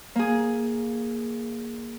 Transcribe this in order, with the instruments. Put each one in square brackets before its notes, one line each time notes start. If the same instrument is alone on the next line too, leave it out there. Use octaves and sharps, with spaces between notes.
[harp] A#3 G#4